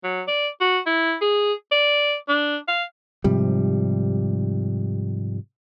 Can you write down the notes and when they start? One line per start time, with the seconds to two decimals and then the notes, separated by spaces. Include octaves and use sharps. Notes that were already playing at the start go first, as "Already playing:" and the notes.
0.04 F#3
0.28 D5
0.61 F#4
0.86 E4
1.22 G#4
1.72 D5
2.29 D4
2.68 F5
3.24 G#2 C3 F3 G3